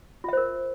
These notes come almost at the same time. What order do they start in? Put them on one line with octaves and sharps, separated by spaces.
F4 E5 C5 A#4